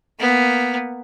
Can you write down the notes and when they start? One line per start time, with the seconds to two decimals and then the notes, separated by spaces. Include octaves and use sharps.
0.19 A#3 B3